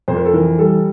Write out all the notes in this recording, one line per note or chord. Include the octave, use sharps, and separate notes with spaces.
F2 C5
A#4
A4
E3 A#4
G3 A4